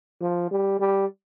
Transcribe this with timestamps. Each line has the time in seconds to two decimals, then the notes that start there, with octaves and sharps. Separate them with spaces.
0.22 F3
0.51 G3
0.80 G3